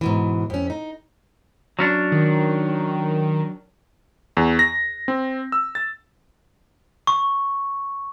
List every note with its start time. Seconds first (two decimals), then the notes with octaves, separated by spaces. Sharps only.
0.01 G#2 B2 E3
0.50 F2 C#4
0.70 D#4
1.79 F#3 C#4 D4
2.12 D#3
4.37 E2
4.59 A#6
5.08 C4
5.52 E6
5.75 A6
7.07 C#6